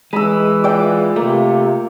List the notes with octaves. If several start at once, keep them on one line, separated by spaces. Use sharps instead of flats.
E3 G#3 B5 E6
F4 D5 G5
C3 A3 A#3